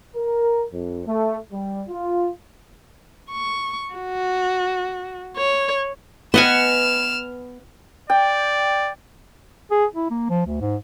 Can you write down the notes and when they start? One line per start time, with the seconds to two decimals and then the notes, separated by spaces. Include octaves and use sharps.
0.16 A#4
0.73 F2
1.07 A3
1.52 G3
1.89 F4
3.32 C#6
3.94 F#4
5.37 C#5
6.34 B3 D#5 F#5 G#5 F6 E7
8.10 D5 G5
9.71 G#4
9.95 E4
10.11 A#3
10.30 F3
10.46 D2
10.61 G#2